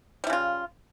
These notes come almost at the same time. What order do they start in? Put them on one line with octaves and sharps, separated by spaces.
G3 E4 C#3 F4